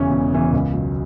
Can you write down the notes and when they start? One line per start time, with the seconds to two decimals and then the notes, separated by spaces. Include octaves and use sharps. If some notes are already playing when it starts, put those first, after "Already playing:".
Already playing: E1 E2 C#3 E3 C#4
0.11 E1
0.33 E2 C#3 E3 C#4
0.53 C#2
0.74 B2 F#3